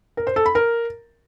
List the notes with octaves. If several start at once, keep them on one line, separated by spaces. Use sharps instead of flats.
A#4
C5
A4
B5
A#4